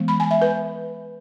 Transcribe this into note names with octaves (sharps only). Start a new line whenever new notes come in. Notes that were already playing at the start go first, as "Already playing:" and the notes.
Already playing: E3 G#3 B3
B5
G#5
E5
B4